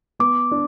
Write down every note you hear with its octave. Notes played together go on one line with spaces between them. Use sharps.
B3 D6
D4